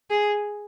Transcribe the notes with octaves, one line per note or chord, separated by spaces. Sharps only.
G#4